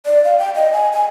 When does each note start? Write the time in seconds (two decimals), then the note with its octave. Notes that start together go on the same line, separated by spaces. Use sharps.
0.06 D5
0.25 F5
0.39 G5
0.55 D#5
0.73 G#5
0.93 G#5